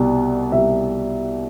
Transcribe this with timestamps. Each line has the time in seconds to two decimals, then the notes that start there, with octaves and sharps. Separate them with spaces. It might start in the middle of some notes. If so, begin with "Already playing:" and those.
Already playing: C2 B2 G3
0.52 C2 B2 G3 E5